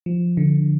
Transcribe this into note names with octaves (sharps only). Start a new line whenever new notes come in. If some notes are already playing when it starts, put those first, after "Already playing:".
F3
D3